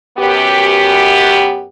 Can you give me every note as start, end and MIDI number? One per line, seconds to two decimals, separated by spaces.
0.18 1.64 42
0.18 1.64 59
0.18 1.64 67